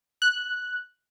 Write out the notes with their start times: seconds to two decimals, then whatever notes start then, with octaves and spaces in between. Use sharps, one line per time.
0.22 F#6